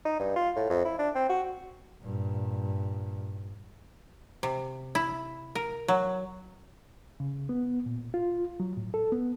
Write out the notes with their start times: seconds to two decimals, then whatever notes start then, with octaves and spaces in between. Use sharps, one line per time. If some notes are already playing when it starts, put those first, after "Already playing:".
0.05 D#4
0.20 G2
0.36 F4
0.56 A2
0.70 F2
0.85 E4
0.99 D4
1.15 C4
1.29 F#4
2.02 G2 A#2
4.43 C3
4.95 E4
5.55 A#4
5.88 F#3
7.20 C#3
7.49 B3
7.86 A#2
8.14 F4
8.60 F#3
8.77 A2
8.94 A4
9.12 B3